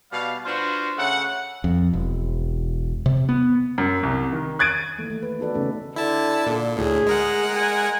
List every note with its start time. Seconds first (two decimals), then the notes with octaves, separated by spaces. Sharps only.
0.11 B2 G3 F5
0.45 D4 F4 F#4 B4 C5
0.97 C#3 A3 F#5
1.64 F2
1.93 E1
3.06 C3
3.29 B3
3.78 F#2
4.03 C2
4.32 D#3
4.59 F#6 G#6 A6 D7 D#7
4.98 D#3 E3 A3 A#3
5.10 E3 A3
5.23 B4
5.39 B3 D#4 F#4 A4 B4 D5
5.54 C#3 E3 A3 C#4 D#4
5.96 D3 E4 A5
6.47 A#2
6.76 D2 A2 G#4
7.06 G#3 A#4 F#5
7.55 G#5